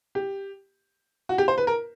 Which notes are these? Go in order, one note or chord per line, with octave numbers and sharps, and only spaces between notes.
G4
F#4
G4
C5
B4
A#4